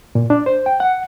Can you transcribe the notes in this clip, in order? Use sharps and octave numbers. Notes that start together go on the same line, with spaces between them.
A#2
D4
C5
G5
F#5